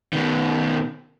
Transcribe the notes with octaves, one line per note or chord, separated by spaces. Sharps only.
B2 D#3